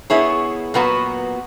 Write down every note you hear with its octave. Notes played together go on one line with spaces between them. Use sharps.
B3 E4 G#4 C#5
A#2 F#3 B3 F#4 B4